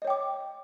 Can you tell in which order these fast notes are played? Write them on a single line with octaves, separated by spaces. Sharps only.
D#5 C#5 G5 D6